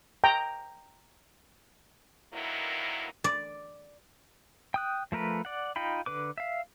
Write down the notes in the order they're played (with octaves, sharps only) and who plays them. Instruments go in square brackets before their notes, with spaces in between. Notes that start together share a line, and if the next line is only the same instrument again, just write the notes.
[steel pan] G5 A#5
[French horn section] D3 D#3 F#3 A#3 B3 E4
[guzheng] D5
[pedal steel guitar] G5 D#6 F#6
F3 A3 A#4 B4
D5 F#5
D#4 F4 G5 B5
D3 B4 D6
E5 F5